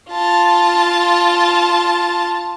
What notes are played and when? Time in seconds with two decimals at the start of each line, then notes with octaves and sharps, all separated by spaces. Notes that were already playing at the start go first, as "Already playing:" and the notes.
0.10 F4 A5